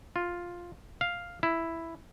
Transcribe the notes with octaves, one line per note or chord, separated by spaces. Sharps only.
F4
F5
E4